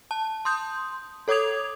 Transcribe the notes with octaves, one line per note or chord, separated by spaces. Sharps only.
A5
C6 D#6 G6
A4 C#5 D6 D#6 G#6 F7